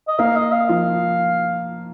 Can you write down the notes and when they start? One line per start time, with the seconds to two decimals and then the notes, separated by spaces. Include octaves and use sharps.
0.08 D#5
0.19 A#3 A#4 F5
0.36 D#5
0.52 F5
0.69 F3 F4